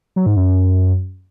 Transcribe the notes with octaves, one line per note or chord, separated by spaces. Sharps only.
F#3
G#2
F#2